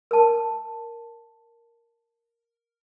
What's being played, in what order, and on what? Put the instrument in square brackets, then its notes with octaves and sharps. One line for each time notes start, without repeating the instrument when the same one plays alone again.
[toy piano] A#4 A5